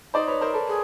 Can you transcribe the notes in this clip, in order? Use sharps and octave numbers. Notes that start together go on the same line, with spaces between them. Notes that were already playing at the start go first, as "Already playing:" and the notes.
D#4 C5 D5
B4 C#5
A#4 C5
A4 B4
G#4